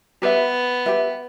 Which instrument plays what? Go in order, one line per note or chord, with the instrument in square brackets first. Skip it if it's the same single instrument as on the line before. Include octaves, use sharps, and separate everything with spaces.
[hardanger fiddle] B3 [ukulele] G4 B4 E5
[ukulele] G4 B4 E5